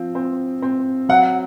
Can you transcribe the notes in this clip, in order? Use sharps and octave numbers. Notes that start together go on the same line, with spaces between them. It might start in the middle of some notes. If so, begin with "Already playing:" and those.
Already playing: F3 C4
C4
C4
F#3 F#5